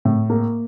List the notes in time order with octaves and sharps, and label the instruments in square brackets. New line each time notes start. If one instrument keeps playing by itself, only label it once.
[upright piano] A2
A#3